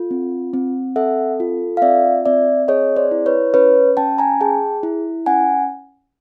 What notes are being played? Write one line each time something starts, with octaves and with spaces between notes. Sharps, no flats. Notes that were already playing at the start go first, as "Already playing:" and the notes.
Already playing: F4 A4
C4
C4
A4 E5 F#5
F4
F5
C4 D5 E5
C4 D5 E5
G#4 C#5 D#5
C5 D5
E4
B4 C#5
C#4 B4 C#5
C#4 G5 A5
G#5 A#5
G#4 G5 A5
E4
C#4 F#5 G#5